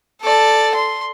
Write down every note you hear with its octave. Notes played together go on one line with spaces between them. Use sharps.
A4 D5
C6